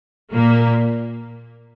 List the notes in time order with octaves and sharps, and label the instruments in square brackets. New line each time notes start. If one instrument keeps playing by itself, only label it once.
[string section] A#2 A#3